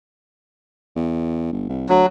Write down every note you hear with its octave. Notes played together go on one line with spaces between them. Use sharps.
E2
G1
C2
D2 F#3